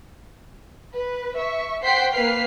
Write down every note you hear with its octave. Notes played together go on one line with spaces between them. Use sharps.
B4
E5 C#6
C5 F#5 G5 G6 B6 C7
A#3 B4 F6 B6 C7